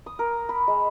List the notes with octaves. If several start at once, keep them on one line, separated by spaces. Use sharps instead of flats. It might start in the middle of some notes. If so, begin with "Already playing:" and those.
D#6
A#4
B5
G#3